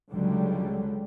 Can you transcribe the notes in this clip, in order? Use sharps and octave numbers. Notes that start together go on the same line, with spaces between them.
C#2 D3 F#3 G3